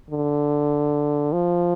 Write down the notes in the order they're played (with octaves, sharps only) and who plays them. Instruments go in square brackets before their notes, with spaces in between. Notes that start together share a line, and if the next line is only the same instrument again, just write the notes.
[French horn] D3
F3